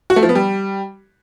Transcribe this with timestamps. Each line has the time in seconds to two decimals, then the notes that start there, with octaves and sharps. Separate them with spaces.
0.10 F#4
0.16 A3
0.23 F3
0.29 B3
0.35 G3